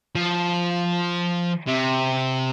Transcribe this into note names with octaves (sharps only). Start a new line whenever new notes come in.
F3
C3